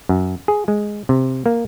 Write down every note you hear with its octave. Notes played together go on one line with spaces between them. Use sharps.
F#2
G#4
G#3
C3
A#3